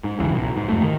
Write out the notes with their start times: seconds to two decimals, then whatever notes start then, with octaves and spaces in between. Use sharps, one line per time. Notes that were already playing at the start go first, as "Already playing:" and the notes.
0.04 G#2
0.19 F1 C2 C#3 E3
0.34 B1
0.57 G#2
0.69 F2 A3
0.82 D#3